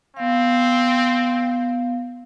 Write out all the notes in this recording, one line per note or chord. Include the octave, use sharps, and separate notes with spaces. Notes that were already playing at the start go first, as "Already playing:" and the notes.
B3 C4 F5